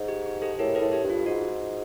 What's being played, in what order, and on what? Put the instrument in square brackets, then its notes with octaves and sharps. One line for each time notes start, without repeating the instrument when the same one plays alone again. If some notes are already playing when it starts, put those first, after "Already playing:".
Already playing: [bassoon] G#2
[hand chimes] G4
G4
G4 A4
[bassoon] A2 [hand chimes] G#4 A#4
[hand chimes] A4 B4
[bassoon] A2
[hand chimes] G4 A4
[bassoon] G2
[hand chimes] F4
[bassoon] G#2 [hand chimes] F#4